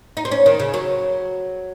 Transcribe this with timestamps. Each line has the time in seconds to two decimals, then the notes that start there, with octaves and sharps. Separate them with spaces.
0.17 D#4
0.25 C4
0.31 C#4
0.46 D#3
0.60 C#3
0.74 F#3